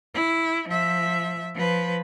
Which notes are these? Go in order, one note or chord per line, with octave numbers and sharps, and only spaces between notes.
E4
F3 E5
F3 B4